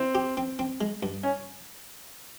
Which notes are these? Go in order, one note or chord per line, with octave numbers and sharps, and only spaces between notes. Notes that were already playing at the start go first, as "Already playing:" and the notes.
Already playing: C4 E4
G4
C4
C4
G#3
G2
C#4